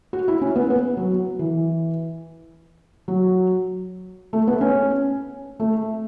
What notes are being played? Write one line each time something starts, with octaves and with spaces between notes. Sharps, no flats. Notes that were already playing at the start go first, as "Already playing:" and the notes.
F#4
E4
C#4
B3
B3
F#3
E3
F#3
A3
B3
C#4
A3